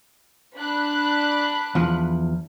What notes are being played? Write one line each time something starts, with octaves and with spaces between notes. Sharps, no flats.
D4 B5 F#6
E2 F3